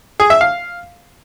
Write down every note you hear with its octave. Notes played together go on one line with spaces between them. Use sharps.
G#4
E5
F5